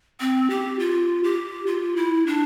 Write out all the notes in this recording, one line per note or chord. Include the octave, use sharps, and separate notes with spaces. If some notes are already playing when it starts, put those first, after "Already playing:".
C4
G4
F4
G4
F4
E4
D4